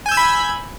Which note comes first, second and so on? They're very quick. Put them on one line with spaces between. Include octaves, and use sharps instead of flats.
G#5 G6 E6 G#6 B5